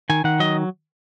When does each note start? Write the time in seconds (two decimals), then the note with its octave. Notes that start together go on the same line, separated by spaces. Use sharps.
0.10 D#3 G#5
0.24 D#3 F#5
0.40 F#3 D#5